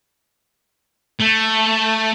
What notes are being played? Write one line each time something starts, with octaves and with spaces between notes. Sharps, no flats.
A3